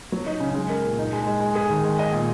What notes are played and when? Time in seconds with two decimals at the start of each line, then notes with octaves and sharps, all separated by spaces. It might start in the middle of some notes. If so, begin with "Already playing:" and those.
0.12 F#3
0.26 D#4
0.40 C#3
0.55 G#3
0.69 A#4
0.84 A#2
0.98 D#4
1.13 G#3
1.27 G#3
1.41 G#3
1.55 G#4
1.70 D#3
1.84 G#3
1.99 D#5
2.12 A#2